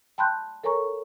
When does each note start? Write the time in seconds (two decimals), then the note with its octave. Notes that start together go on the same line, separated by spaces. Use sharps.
0.18 G5 A5 B5 C6 F#6 G6
0.64 A4 A#4 C#5 G#5 A#5 C#6